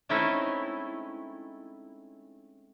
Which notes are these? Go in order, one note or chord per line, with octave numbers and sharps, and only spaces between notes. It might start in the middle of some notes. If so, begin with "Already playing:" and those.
G#3 A3 C4 C#4 D#4 E4